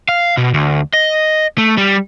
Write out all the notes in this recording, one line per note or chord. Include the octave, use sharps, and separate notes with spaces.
F5
B2
D2
D#5
A3
G3